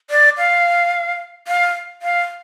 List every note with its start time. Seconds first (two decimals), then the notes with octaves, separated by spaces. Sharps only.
0.10 D5
0.37 F5
1.47 F5
2.02 F5